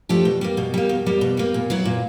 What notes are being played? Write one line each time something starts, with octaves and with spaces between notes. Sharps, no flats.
F3 A3 D4 G4
B2
G3 A#3
B2
G3 A#3
B2
G3 A#3
B2
G3 A#3
A#2
F#3 B3 E4
A#2